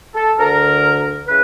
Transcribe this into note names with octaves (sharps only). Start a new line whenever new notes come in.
A4
D2 D3 A#4
C#3 E3 B4